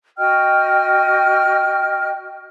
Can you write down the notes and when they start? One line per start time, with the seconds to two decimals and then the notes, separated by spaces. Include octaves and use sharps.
0.17 F#4 D#5 G5 F6